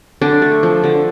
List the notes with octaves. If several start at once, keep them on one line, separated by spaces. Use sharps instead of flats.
D3 D4
A3
F3
D3